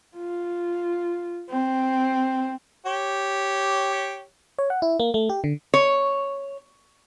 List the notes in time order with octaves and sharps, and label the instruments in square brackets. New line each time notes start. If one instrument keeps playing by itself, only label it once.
[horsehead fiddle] F4
C4
[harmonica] G4 C#5
[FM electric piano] C#5
F#5
E4
A#3
A3
G4
D3
[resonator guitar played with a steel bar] C#5